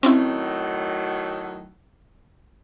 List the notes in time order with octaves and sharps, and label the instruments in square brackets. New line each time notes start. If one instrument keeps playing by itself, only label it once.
[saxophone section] A2 D#3 F#3 [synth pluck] C4 C#4 E4